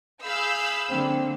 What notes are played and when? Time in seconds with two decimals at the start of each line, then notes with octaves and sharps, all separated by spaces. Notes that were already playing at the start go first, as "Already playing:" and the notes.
0.24 G#4 F5 B5 E6 G6
0.89 D3 A#3 C4